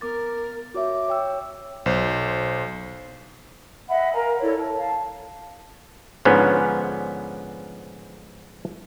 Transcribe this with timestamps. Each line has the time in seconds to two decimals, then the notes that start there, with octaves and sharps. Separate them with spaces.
0.01 B3 A#4 D6 A6
0.74 F#4 C#5 E5 D6
1.08 C#5 G5 E6
1.86 B1 C5
3.88 D#5 E5 F#5 B5
4.13 A#4 F5 G#5 A#5
4.40 E4 A4 C#5 D5
4.58 A5
4.79 F5 A5
6.25 G#2 D3 F3 B3 C#4